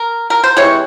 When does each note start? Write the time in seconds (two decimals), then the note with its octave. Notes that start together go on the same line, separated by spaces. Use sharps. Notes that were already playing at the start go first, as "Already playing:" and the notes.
Already playing: A#4
0.30 A#4
0.44 C5
0.57 C3 E3 G#3 C#5